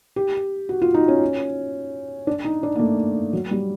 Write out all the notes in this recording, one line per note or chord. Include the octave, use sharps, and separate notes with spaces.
G4
F#4
F4
D#4
C#4
D4
D#4
D4
A#3
A3
F#3
G3